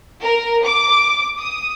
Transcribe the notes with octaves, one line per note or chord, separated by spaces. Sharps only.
A#4
D6
D#6